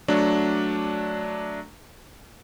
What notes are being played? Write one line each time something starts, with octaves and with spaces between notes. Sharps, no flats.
F#3 A3 D4